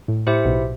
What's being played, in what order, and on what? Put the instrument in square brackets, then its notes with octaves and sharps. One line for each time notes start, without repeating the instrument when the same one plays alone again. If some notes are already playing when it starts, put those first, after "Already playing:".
[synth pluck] A2
[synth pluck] A2 [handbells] E4 G4 C5 E5
[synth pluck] B1 B2